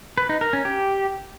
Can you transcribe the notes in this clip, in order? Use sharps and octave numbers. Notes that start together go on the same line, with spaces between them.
B4
D#4
A#4
C#4
G4